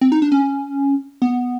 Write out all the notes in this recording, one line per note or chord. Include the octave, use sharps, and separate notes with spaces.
C4
D#4
D4
C#4
B3